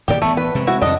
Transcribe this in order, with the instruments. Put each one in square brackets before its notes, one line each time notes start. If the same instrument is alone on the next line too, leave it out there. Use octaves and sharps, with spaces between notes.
[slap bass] D1 A#2 D#3 [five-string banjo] G4 D5
[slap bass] E3 B3 [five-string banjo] A3
[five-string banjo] B4
[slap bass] C3 G#3
[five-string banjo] E4 F#4
[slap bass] F2 C3 [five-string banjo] D4 D#5